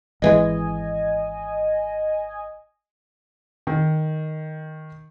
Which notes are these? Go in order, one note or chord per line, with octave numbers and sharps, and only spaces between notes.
G#1 E3 G#3 D#5 G#5
D#3